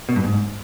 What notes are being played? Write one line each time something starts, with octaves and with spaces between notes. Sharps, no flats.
B2
G2
G#2